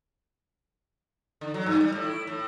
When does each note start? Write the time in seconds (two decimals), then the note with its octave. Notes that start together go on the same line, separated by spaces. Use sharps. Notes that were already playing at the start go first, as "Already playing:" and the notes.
1.41 D3
1.54 F#3
1.66 G2
1.81 G3
1.92 A2
2.04 E4
2.27 A2